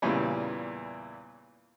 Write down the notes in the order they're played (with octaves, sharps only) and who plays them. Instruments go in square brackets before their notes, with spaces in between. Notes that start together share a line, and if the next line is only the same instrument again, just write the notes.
[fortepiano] E2 A#2 C#3 E3 G3